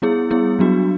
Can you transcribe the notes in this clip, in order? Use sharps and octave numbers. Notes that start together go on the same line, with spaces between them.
G3 B3 E4 G#4
G3 B3 E4 G#4
F#3 B3 D4 F#4